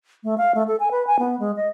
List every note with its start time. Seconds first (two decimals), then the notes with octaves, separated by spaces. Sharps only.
0.24 A3
0.38 F5
0.55 A3
0.68 A4
0.80 G#5
0.91 B4
1.07 G#5
1.19 B3
1.40 G#3
1.56 D#5